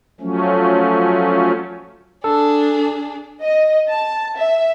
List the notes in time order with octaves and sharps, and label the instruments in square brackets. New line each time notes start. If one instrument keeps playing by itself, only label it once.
[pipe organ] F3 F#3 A3 C#4
[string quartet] D4 G#4 [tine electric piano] A4
[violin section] D#5
A5
E5